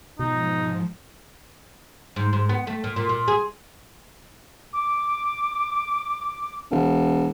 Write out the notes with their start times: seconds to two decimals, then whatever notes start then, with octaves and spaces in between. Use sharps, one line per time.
0.19 G#2 B2 F3 D#4
2.16 G#2
2.33 G#2
2.49 B3
2.67 A3
2.84 A#2
2.96 A#2
3.09 A#2
3.28 G#4
4.73 D6
6.71 E1